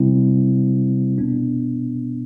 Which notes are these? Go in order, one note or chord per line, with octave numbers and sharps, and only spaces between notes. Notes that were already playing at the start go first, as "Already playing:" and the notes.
Already playing: C3 G3 C4 E4
B2 B3 D4